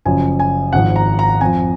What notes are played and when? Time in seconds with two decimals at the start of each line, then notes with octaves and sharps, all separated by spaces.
0.05 F#1 F#2 F3 G#5
0.40 G#5
0.73 G#1 G#2 F3 F#5
0.96 A#5
1.19 A#5
1.41 F2 F3 G#5